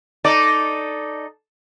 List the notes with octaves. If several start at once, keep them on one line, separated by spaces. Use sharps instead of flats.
D#4 A4 D5